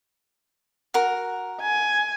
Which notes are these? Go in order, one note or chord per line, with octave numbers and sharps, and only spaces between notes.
F#4 A#4
G#5